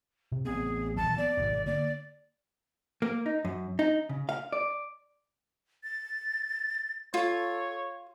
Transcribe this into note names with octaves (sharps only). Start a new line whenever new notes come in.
C3
A1 B3 C4 G#4
D#1 B1 E3 A5
B3 D5
G#1 G#2 B2
D3 A#3 D5
A#3
D#4
F#2
D#4
C#3
F5
D5
A6
F4 A4 C#5